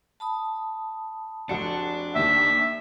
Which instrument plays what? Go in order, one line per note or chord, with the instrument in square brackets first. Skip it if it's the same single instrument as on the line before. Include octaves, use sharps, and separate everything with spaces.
[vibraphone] A5 B5 D#6
[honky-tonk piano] F1 F#4 C#7 [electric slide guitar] D4
[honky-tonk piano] D#2 D#3 [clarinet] E5